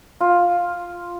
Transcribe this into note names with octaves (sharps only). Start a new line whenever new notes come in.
F4